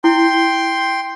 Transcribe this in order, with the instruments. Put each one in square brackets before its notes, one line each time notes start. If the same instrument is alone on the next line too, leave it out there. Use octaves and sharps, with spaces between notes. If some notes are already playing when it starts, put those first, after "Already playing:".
[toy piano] E4 [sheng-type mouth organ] G5 C6